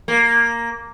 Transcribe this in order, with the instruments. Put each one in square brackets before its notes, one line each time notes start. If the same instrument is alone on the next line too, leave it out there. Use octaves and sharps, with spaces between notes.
[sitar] A#3